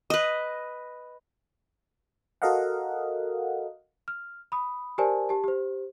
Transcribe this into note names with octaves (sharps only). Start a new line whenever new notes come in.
B4 D#5
F#4 A4 A#4 D#5 F5 F#5
F6
B5 D#6
G4 A#4 C5 D5 G#5 A5
G4 A5
G4 C5